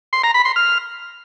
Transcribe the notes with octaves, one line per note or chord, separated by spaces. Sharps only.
C6
A#5
B5
C6
F6